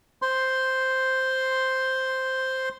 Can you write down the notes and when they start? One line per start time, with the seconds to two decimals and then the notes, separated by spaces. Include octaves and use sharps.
0.22 C5 C6